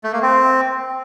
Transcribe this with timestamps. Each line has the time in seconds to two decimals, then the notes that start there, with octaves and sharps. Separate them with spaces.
0.04 A3
0.13 A#3
0.22 C4